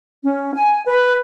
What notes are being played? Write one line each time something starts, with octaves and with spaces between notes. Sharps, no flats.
C#4
G#5
B4